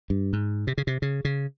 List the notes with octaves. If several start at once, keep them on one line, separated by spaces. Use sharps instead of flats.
G2
G#2
C3
C#3
C3
C#3
C#3